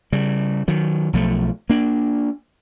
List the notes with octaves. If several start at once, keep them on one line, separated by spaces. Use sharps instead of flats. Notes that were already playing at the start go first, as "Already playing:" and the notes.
C#3 G3
D#3 F#3
B1 F3 A3
A#3 D4